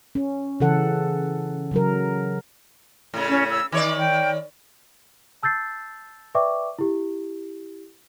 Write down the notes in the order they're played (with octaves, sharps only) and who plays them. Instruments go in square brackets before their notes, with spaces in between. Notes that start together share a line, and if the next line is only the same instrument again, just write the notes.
[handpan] C#4
C#3 E3 A4 F#5
C#3 F#3 A#4
[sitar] A2 C#3
[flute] C#4
E6
[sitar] D#3 C#5 D5 [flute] D6
[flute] G5
[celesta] A5 E6 G6 A6 C7
B4 D5 E5 G5 C#6 D6
E4 G4